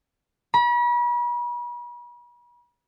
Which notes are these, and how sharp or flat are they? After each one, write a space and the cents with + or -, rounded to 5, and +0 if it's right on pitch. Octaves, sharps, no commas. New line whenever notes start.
B5 -40